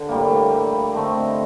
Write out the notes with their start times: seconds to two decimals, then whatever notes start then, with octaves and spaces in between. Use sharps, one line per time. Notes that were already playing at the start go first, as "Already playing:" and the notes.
Already playing: D3 G5
0.09 A2 G3 A#3
0.94 D3 A3 C4 D#5